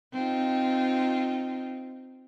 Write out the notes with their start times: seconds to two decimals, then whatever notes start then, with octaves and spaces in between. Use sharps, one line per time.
0.13 C4 D#4 F4